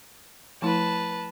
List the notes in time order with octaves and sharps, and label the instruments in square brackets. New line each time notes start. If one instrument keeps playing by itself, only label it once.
[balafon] F3 A3 E4 [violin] B4 A5